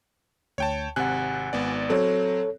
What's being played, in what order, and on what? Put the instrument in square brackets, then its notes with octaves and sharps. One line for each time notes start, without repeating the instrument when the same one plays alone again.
[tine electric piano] D2 [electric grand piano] C#5 G5 A5
[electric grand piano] G#1 C3 F#6 [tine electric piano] F#5 G#5
[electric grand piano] G#1 B3 D5
[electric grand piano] F#3 C4 [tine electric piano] A4 C#5